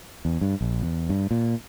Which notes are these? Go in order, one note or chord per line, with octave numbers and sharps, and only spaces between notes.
E2
G2
A#1
E2
G2
A#2